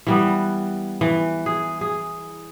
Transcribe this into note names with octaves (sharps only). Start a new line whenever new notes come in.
E3 G3 B3
E3
G#4
G#4